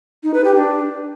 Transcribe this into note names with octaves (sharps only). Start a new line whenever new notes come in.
D#4
B4
G4
D4